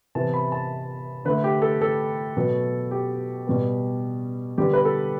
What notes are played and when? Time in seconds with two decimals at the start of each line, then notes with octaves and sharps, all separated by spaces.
0.15 C3 E3 B3 A5
0.33 B5
0.52 A5
1.25 D3 A3 B4
1.44 G4
1.62 A4
1.81 A4
2.37 B2 F#3 B3
2.91 G4
3.47 B2 G3 B3
4.58 D3 G3 B3 G4
4.73 B4
4.85 A4